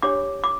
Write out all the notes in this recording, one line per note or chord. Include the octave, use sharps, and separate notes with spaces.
D4 G4 C#5 D6
D6